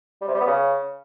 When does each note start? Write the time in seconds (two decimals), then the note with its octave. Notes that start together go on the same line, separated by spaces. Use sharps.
0.21 G3
0.28 C3
0.34 G3
0.40 B3
0.47 C#3